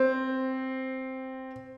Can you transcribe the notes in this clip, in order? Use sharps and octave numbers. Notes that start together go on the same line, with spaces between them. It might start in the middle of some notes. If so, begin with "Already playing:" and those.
Already playing: C4